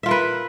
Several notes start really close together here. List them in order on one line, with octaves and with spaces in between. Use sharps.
E5 F4 A#4 B4